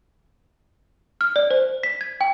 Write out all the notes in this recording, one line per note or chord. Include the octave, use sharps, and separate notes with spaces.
F6
D5
C5
B6
G#6
G5